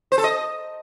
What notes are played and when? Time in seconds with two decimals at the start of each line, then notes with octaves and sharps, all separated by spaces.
0.12 C5
0.18 A4
0.24 D#5